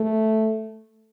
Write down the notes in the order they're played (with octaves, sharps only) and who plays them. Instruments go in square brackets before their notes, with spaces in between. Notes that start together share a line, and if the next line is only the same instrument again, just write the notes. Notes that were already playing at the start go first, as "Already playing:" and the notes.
Already playing: [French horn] A3